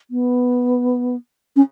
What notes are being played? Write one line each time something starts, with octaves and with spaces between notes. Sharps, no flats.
B3
C#4